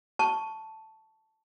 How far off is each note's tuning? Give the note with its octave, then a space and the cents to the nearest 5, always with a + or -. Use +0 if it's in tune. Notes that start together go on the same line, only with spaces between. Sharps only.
A5 +0 C#6 +0